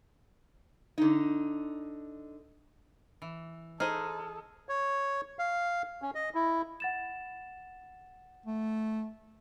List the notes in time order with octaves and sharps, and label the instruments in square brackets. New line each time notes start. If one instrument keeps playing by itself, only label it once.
[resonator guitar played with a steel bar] D3 D#4
[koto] E3
[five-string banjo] D#4 C5 [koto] G#4 [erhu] A4 [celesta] F6
[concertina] C#5
F5
C#4
D#5
E4
[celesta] F#5 A6 E7
[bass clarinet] A3